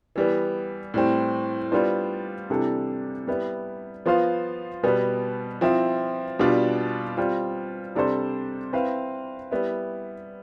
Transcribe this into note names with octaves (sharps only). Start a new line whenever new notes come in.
E3 G3 B3
A2 G3 C4
G3 B3 D4 F4 C5
C3 E3 G3 D4 A4
G3 B3 E4
F3 B3 F4 C5 F5
B2 G3 B3
F3 C4 E4
B2 G3 D4 F4
G3 C4 F4
C3 G3 D4 A4 C5
C4 E4 B4 F5
G3 B3 E4